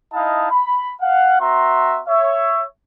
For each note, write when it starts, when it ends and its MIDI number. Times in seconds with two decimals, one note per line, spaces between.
0.13 0.48 63
0.13 0.48 64
0.13 0.48 75
0.13 0.48 77
0.13 0.48 81
0.51 0.92 83
1.01 1.36 77
1.01 1.36 78
1.41 2.01 60
1.41 2.01 66
1.41 2.01 76
1.41 2.01 82
1.41 2.01 84
2.08 2.64 73
2.08 2.64 76